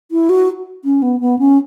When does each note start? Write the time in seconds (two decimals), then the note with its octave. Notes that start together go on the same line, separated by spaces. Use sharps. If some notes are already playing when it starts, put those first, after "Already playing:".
0.11 E4
0.29 F#4
0.84 C#4
1.02 B3
1.21 B3
1.39 C#4